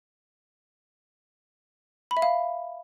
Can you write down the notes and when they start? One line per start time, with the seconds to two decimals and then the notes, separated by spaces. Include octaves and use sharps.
2.11 B5
2.17 E5
2.22 F5